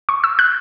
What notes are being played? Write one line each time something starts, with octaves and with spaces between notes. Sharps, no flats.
C#6
E6
F#6